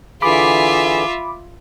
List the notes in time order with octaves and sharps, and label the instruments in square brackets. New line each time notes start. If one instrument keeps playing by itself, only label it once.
[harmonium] D3 E3 G#4 [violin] F4 E5 [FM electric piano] B5 D6